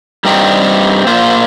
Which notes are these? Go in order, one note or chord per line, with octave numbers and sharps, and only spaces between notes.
G2 G3 C4 D#4 G4
A#2 A#3 F4 C5